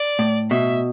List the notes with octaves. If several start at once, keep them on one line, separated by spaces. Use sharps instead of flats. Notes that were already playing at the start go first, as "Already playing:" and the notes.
Already playing: D5
A2
B2 E5